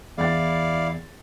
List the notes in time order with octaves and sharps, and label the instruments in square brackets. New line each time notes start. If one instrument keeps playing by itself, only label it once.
[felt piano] E2 A6 [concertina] E4 D5 F5